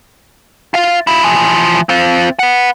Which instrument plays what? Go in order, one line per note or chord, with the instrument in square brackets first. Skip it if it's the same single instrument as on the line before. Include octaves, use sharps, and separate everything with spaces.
[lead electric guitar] F4 F5
E4 F4
E3 F3
C4 F4
B4 F#5